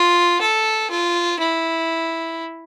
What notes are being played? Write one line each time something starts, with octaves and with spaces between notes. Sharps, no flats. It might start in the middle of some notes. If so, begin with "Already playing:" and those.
Already playing: F4
A4
F4
E4